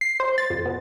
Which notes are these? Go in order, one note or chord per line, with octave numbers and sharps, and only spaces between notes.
C7
C5
A6
F2
B2